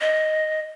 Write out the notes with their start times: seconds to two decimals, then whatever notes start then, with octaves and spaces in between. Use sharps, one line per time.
0.01 D#5